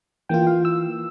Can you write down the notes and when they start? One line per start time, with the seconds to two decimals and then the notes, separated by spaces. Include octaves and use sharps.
0.29 E3 A#3 F4 G5
0.47 F5
0.65 E6